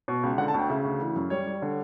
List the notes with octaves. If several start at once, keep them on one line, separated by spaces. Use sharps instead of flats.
B2
C#2
D3 F#5
A5
D2 G5
C#3 E5
D2
E3
F#2
G3 C#5
G3
D3